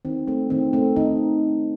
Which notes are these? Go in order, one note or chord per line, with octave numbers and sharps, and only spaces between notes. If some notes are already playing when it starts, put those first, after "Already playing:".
D#3 C4
A3 C4
D#3 C4
A3 C4
D#3 D#4